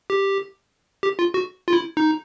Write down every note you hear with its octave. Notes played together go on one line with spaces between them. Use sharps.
G4
G4
F4
F#4
F4
E4
D#4